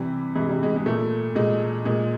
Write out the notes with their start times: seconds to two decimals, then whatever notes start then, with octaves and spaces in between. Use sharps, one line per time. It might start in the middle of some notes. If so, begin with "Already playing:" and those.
Already playing: C3 E3 G3
0.35 C3 E3 G#3
0.49 G3
0.63 G#3
0.76 G#3
0.86 A#2 A3
1.35 A#2 G#3
1.85 A#2 G#3